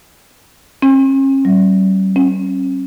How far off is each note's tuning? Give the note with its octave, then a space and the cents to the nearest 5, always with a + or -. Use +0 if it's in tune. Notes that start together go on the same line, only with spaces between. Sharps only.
C#4 -40
G3 -45
C#4 -35